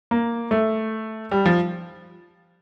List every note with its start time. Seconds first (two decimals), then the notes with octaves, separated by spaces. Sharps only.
0.11 A#3
0.51 A3
1.31 G3
1.46 F3